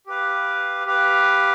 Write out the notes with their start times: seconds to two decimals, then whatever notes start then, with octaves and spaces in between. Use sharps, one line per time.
0.07 G4 B4 F5
0.86 G4 B4 F5